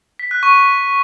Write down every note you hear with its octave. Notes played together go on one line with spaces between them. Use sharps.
B6
F#6
C#6